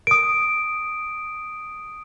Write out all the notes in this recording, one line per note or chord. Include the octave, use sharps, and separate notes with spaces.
D#6 D7